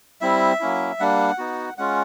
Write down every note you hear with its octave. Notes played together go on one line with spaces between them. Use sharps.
G3 C4 E4 E5
F#3 A#3 C#4 E4
G3 A#3 D4 F#5
B3 D#4 F#4
G#3 C#4 F4 F#5